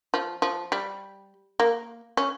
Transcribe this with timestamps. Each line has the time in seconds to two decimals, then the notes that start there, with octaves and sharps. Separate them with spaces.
0.14 F3
0.42 F3
0.72 G3
1.60 A#3
2.17 C#4